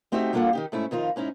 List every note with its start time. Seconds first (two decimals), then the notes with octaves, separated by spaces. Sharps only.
0.12 A3 C4 D#4 F#4 G4 E5
0.33 G3 A#3 D4 F4 A4 F#5
0.53 D#3 D#4 G4
0.72 G#2 A3 C#4 E4
0.91 F2 D#3 D#4 F4
1.16 G#2 C#4 D#4 E4